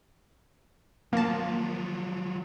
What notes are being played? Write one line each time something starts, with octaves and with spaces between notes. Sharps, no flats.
F3 F#3 A#3 A5